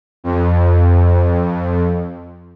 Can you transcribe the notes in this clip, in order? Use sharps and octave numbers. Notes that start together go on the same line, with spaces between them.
F2